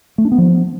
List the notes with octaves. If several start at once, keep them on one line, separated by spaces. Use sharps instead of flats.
A3
D4
B3
F3